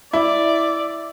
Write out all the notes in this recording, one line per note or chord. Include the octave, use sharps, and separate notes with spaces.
E4 D5